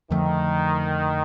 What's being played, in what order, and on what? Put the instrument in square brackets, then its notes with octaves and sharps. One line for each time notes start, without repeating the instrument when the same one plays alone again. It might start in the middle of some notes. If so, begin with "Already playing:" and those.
[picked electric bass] F2 D3 F3 A3 [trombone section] D#3